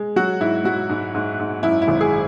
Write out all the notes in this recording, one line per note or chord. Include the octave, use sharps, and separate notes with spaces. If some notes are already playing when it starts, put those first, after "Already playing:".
Already playing: G#3
F#3 F#4
G#2 E4
F#3 F#4
G#2
G#2
G#2
F#2 E4
E4
G#1
G#4